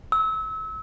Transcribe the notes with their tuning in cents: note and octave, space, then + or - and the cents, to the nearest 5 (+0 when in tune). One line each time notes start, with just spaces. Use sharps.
E6 -30